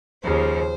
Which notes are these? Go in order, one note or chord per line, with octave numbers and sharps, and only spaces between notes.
D#2 C#3 F3 C5